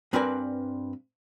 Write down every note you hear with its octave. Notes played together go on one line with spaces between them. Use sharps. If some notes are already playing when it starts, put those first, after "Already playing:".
G2 C4 A#4 B4 D5 G#5